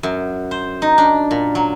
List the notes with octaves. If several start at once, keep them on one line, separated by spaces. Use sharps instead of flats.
F#2
C5
D#4
D4
A#2
F#3